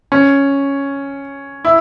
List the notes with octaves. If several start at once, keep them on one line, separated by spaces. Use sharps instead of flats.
C#4
E4